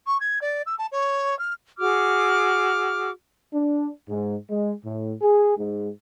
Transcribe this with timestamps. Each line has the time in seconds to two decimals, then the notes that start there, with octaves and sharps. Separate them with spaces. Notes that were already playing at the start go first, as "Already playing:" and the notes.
0.06 C#6
0.20 G#6
0.41 D5
0.66 E6
0.78 A5
0.91 C#5
1.39 F6
1.79 F#4 G#4 D6 F6
3.53 D4
4.08 G#2
4.49 G#3
4.85 A2
5.22 G#4
5.58 G#2